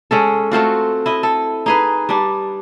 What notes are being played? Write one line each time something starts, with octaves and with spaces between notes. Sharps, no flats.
G#3 C#4 A4
A3 C4 F4 F#4
E4 D#5
A4
D#4 G#4 B4
G3 D4